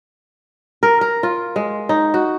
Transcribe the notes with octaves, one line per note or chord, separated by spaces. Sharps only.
A#4
A#4
F4
G#3
D#4
F#4